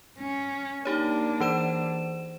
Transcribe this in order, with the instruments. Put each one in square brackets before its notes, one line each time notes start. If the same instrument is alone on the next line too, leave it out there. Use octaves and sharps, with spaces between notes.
[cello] C#4
[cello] A#3 D4 [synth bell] D#4 G4 C#5
[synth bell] E3 C5 E7